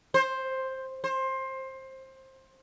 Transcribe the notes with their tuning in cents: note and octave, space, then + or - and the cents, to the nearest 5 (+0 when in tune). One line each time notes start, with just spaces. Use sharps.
C5 +10
C5 +20